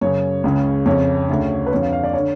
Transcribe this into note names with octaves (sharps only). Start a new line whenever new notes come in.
F#2 C#3 C#5
C#2 C#3
F2 C#3 C#5
D2 C#3
B4
F2 D3 C#5
F5
F5
D5
D3 C#5